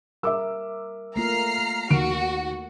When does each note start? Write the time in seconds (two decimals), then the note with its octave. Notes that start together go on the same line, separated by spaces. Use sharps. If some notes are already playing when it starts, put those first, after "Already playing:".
0.23 G3 A#4 E5 D6 E6
1.16 A3 A#3 F4 A#5 F6 C7
1.90 D#2 F#4 D7